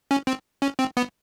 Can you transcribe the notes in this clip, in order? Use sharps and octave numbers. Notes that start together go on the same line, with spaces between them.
C#4
C4
C#4
C4
B3